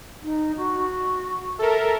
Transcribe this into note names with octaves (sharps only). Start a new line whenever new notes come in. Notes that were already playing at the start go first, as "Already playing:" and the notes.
D#4
F#4
A4 A#4 E5